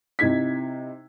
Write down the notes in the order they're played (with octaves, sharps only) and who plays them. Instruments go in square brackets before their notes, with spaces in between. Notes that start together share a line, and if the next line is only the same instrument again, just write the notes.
[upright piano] C3 D#4 E4 G#6 B6